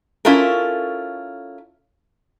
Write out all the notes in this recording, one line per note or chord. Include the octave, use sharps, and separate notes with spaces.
C#4 E4 F4 A4 A#4